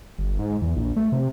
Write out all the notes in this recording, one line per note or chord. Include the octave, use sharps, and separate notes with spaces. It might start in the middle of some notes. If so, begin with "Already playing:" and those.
G1
G#2
E2
A#1
A3
C3